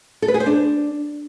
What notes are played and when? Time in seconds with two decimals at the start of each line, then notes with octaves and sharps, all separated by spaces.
0.22 A4
0.28 B4
0.34 G#4
0.40 C5
0.46 D4